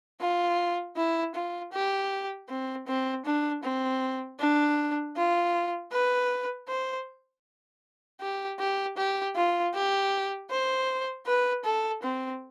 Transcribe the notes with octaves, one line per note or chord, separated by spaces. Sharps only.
F4
E4
F4
G4
C4
C4
D4
C4
D4
F4
B4
C5
G4
G4
G4
F4
G4
C5
B4
A4
C4